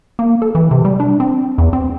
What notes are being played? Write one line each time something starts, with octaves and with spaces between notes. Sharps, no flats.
A#3
A4
E3
C3
G3
D4
C4
E2
C4